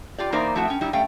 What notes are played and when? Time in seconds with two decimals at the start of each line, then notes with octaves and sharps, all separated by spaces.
0.18 F4 G4 D5
0.32 E3 A#3 D#4 A#4 C5 D5
0.55 F3 A3 C4 E4 F#4
0.68 C#4 G5
0.81 G3 D#4 E4
0.93 G3 A3 C#4 F5 G5